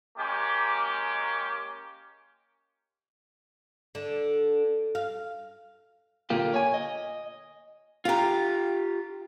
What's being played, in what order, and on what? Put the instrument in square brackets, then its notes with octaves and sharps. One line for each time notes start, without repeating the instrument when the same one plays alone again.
[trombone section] G#3 A#3 C#4 G4
[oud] D3
F5
[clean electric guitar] D2 A#2 D3 A#3 G4
C#5 G#5
D#5
[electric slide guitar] F4 G4 [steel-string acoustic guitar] F5 A#5